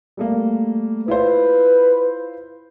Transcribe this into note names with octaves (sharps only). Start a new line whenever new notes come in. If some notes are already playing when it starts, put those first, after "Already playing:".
G3 A3 A#3
E4 F4 B4 C5